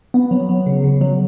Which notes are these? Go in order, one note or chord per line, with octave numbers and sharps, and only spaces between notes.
B3
F#3
F#3
C#3
C#3
F#3